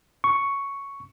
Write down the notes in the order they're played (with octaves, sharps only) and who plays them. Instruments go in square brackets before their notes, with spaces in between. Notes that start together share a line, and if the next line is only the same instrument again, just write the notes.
[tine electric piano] C#6